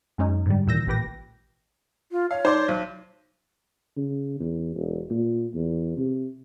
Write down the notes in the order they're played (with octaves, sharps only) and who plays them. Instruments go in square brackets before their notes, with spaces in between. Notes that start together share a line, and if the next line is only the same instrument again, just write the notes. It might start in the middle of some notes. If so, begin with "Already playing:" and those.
[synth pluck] F#2 G#3 C#4 D#4
G#2 D3 G3
D#2 A#2 E3 E6 G6 A#6
A1 A#2 G4 B4 G5 A#6
[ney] F4
[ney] C#5 [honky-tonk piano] F5
[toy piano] D#4 D6 [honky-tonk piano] C5 D5 C6
[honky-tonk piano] B1 [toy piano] C5
[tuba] C#3
E2
E1
A#2
E2
C3